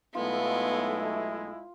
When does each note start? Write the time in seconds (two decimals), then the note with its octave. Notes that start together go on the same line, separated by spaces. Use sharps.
0.15 B1 G#3 A3 B3 E4 F4